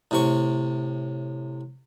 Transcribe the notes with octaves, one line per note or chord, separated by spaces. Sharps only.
A2 C3 C#6